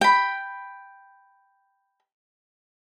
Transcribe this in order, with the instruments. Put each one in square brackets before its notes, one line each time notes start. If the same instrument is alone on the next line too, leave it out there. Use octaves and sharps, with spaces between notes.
[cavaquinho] G5 B5